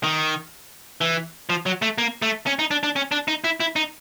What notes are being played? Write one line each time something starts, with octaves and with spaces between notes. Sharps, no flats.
D#3
E3
F3
F#3
A3
A#3
A3
C#4
D#4
D4
D4
C#4
D4
D#4
E4
E4
D#4